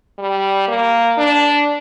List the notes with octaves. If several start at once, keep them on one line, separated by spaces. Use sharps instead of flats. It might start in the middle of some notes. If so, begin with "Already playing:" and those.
G3
A#3
D4